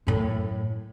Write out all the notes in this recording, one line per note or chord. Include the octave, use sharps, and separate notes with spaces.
F#2 A2